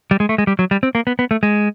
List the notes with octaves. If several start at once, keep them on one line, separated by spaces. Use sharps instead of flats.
G3
G#3
A3
G#3
G3
F#3
G3
C4
A#3
B3
B3
A3
G#3